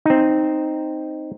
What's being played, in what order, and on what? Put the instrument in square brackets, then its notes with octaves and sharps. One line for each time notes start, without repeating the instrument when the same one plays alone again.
[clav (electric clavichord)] C4 D#4